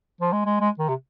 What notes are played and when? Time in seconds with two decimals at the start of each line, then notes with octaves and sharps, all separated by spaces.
0.21 F3
0.32 G#3
0.45 G#3
0.60 G#3
0.79 D#3
0.88 C3